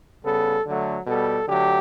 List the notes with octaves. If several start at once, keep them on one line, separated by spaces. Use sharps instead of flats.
C#3 G3 B3 A4
D3 F#3 A3
B2 G3 B3 A4
D3 F#3 A3 G4